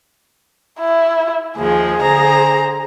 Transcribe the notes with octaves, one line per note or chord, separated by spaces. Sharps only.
E4
D#2 F3 G#3 G#4
D3 C5 A#5